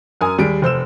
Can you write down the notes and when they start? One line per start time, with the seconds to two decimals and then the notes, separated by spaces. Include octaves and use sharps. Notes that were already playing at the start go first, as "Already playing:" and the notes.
0.21 F#2 A#4 G#5 D#6
0.38 D#2 G3 G#4 D7
0.62 F1 C5 E6 E7